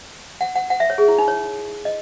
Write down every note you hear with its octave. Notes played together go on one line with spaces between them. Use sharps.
F#5
F#5
F#5
E5
C#5
G#4
E4
D#4
C#5
D#5